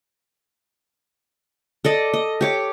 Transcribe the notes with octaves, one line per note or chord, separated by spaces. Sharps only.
A4 D5 D#5
D#5
G4 C#5 D6